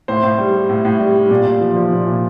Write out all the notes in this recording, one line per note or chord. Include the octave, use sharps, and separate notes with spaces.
A2 C5
A2
G3
G3
A2
A2
G3
G3
A#2 D5
A#2
F3
F3
A#2
A#2